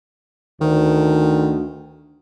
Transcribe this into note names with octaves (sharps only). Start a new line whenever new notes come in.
D2 D#3